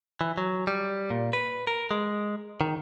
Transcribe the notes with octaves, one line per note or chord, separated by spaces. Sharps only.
E3
F#3
G3
A#2
B4
A#4
G#3
D#3